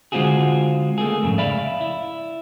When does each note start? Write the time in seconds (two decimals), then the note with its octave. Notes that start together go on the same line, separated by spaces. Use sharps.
0.12 D3 G#3 C4 F4 F#4 G#4
0.98 A3 A#3 G#4
1.23 F2 G#2 C#3
1.38 D5 E5 F5 B5
1.81 E4